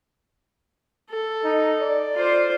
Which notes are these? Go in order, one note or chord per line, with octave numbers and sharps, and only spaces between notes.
A4
D#4
D5
F4 C5